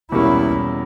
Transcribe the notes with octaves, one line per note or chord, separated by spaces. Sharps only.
E2 B2 G3 A#3 C#4 E4